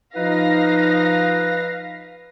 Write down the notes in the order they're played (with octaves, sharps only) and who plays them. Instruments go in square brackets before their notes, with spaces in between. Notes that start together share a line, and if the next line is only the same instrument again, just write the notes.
[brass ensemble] F3 D#4 [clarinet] B4 [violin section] F5 A#6